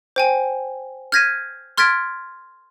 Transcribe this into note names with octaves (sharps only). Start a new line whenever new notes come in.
C5 G5 G#5
F6 G6 G#6 A#6 B6 D#7
C6 F6 G#6 A6 B6 D7